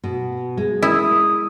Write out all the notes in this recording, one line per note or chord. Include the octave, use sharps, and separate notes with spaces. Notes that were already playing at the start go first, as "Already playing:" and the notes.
B2
G#3
E4 D#6